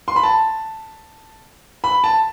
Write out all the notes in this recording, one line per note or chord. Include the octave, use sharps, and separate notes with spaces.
C6
B5
A5
B5
A5